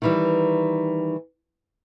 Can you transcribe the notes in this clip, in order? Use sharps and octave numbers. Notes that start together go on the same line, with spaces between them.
D#3 E3 G3